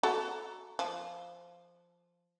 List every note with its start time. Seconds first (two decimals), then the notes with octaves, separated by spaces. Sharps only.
0.03 F#4 A4 A#5
0.79 F3